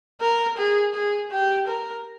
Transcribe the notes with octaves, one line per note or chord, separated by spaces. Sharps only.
A#4
G#4
G#4
G4
A#4